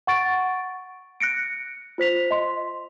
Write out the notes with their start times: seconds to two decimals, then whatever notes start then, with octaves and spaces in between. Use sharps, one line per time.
0.07 F#5 C#6 A6 D7
1.20 F#6 A#6 C#7 D7
1.98 F4 C5 B6 F7
2.31 D#5 C6